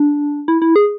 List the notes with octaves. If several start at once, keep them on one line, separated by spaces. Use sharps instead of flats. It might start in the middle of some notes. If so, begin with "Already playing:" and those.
Already playing: D4
E4
E4
G#4